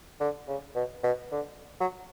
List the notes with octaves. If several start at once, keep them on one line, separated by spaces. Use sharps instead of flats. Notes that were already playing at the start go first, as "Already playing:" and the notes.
D3
C#3
B2
B2
D3
F#3